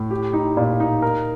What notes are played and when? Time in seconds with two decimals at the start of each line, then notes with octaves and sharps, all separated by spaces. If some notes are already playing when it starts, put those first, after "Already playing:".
Already playing: A2
0.11 G4
0.33 D#4
0.57 A#2
0.80 D#4
1.02 A#4